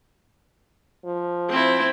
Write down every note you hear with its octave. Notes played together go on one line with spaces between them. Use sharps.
F3
C4 E4